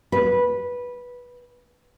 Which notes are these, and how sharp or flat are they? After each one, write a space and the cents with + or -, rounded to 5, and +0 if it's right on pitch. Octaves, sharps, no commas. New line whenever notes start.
B4 -10